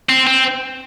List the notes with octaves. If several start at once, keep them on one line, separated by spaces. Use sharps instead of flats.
C4
C4